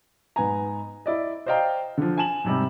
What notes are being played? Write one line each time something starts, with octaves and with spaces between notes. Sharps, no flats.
G#2 B3 G#5 A#5
E4 D5 D#5
C5 D5 D#5 F5 G5 A#5
D3 F3
G#5 A5 E7 F#7
G#2 C3 G3 C4